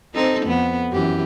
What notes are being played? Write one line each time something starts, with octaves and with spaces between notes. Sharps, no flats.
C4 D#4 A4
F2 B3
F#2 E3 G4